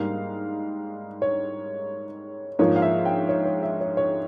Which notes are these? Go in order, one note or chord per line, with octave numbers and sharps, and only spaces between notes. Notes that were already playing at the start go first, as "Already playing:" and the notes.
Already playing: G#2 G3 A#3 F5
C#5
G#2 F3 A#3 C#5
F5
E5
G5
C#5
C#5
E5
C#5
C#5